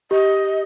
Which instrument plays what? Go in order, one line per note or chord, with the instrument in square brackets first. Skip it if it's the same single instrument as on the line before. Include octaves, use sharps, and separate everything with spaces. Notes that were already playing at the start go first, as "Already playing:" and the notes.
[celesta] G4 [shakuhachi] D#5